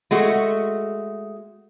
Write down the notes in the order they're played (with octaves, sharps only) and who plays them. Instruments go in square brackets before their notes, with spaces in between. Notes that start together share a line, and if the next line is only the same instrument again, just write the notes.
[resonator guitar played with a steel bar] G#3 A3 F#4